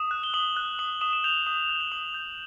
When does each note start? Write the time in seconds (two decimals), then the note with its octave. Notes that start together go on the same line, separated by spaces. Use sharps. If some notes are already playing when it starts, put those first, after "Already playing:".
Already playing: D#6 E7
0.11 F#6
0.23 G7
0.34 D#6 F#7
0.57 F#6
0.79 D#6 F#7
1.01 D#6 E7
1.13 E7
1.24 G6 F7
1.47 D#6
1.70 G6 G7
1.81 F#7
1.92 D#6 F#7
2.14 G6 F7